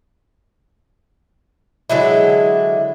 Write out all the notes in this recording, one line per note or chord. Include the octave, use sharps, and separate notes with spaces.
D3 F#3 G#3 E4